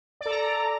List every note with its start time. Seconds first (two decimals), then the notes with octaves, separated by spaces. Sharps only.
0.21 D5
0.26 A4
0.31 A#5